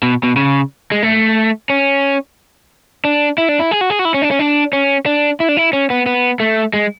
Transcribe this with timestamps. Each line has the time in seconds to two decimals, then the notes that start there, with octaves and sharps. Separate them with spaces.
0.03 B2
0.23 B2
0.36 C#3
0.92 G#3
1.03 A3
1.70 C#4
3.05 D4
3.38 E4
3.49 D4
3.59 E4
3.71 G#4
3.81 F#4
3.90 G#4
3.99 F#4
4.05 E4
4.14 C#4
4.22 D4
4.31 C#4
4.39 D4
4.73 C#4
5.06 D4
5.40 E4
5.49 D4
5.57 E4
5.73 C#4
5.90 B3
6.06 B3
6.40 A3
6.73 G#3